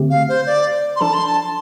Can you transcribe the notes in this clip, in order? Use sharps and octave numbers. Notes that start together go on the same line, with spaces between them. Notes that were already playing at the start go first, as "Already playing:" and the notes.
Already playing: D3 A3 C4 G4
F5
C5
D5
C6
F3 D4 A4 A5
C6
A5